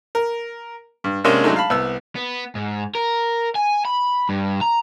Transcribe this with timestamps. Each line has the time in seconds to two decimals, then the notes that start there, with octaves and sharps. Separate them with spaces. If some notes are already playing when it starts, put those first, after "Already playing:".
0.15 A#4
1.04 G2
1.24 C3 G#3 A#3 C#4 D4 G#4
1.44 F#3 G#3 A3 D4 D#4
1.56 F5 A5 B5
1.70 C2 B3 E6
2.15 B3
2.55 G#2
2.95 A#4
3.55 G#5
3.85 B5
4.29 G2
4.61 A#5